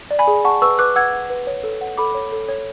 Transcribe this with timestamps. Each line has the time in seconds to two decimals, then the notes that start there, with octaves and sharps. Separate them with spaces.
0.11 D5
0.19 G#5 B5
0.27 G#4
0.45 F#5 A5 C#6
0.62 B4 C#6 E6
0.79 B4 D6 F#6
0.96 F#5 E6 G#6
1.13 F#5
1.30 B4
1.47 C#5
1.63 A4
1.81 F#5
1.98 A4 B5 D6
2.15 C#5
2.32 A4
2.48 C#5